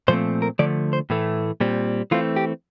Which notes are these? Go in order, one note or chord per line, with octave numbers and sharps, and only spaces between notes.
A#2 F3 A3 C4 C5
A#4
D3 F3 A3 D5
C5
A2 E3 A3
A#2 G3 C4
E3 A3 C4 F4
G4